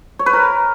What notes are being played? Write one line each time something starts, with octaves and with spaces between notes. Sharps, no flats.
C#5
B4
A#4